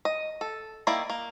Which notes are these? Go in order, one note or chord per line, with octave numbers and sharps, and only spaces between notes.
D#5
A4
D#3 A#3 E4 D5
A#3